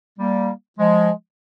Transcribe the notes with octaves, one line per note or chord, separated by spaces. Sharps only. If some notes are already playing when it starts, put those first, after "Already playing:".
G3 A#3
F3 G#3